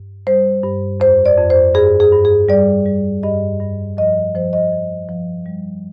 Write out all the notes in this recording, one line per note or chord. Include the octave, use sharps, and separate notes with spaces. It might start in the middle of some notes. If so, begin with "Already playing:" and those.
Already playing: G2
G3 C5
G2
F2 C5
D5
F2
C5
G2 G#4
G#4
G2
G#4
G3 D5
G3
G2 D#5
G2
F3 D#5
F3 C5
D#5
F3
F3
G3